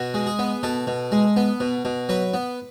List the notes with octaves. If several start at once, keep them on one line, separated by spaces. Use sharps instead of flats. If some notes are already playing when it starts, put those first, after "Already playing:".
Already playing: B2 F#4
G#3
G#4
B3
B2 A4
B2
G#3
B3
B2
B2
F#3 B4
B3